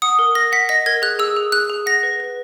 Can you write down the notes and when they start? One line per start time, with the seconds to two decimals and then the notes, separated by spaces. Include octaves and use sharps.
0.02 F#5 D#6
0.19 A#4
0.35 A#4 A#6
0.52 F#5 B6
0.69 D#5 A#6
0.86 A#4 G#6
1.02 G#4 F#6
1.19 G#4 E6
1.36 G#4
1.52 G#4 F#6
1.70 G#4
1.86 F#5 A#6
2.03 B4
2.20 B4